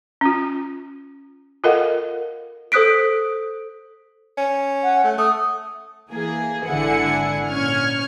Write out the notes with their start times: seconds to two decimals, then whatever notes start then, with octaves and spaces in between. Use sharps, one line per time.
0.21 C#4 F4
1.64 F4 A4 A#4 D#5 F5 F#5
2.72 A4 C5 D#6 F#6 B6 D7
4.37 C#4
4.83 F#5
5.04 A3
5.18 A3 D#6
6.10 E3 A#3 G#4
6.68 G#1 D3 E4 F#5 G#5 C#7
7.50 A#2 C#4 C#6 F6 G#6